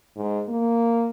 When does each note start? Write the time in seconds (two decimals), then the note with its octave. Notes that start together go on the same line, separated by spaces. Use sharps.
0.16 G#2
0.48 A#3